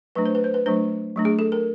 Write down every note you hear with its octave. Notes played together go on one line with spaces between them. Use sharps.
F#3 A3 D4 B4
C5
B4
C5
B4
F#3 A3 D4 C5
F#3 A3 D4
G#4
A4
A#4